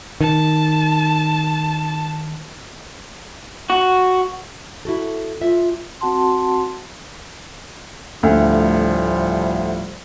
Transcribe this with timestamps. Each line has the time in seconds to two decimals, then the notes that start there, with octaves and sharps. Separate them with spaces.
0.21 D#3 A5
3.70 F#4
4.85 E4 F#4 A4
5.42 F4 E5
6.01 C4 F#4 F#5 A5 C6
8.23 D2 A2 F3 G3